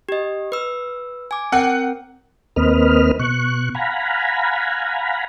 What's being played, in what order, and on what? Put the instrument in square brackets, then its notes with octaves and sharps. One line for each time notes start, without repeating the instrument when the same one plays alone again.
[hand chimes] G4 D#5
B4 E6
G#5 D6
[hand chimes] C4 A#4 G5 [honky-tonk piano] F#5
[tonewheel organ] D#2 A#3 C4 B4 D#5 F6
B2 C#6 F#6
F5 F#5 G#5 A#5 B5